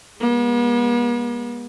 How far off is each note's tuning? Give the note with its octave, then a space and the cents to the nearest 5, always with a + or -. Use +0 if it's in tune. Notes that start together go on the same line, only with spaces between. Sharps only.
G#3 -30 B3 -45